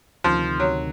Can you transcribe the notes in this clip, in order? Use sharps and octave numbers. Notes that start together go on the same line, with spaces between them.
D2 C3 D#3 F3
F#3